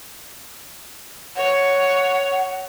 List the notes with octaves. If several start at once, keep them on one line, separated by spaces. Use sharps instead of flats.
C#5 F#5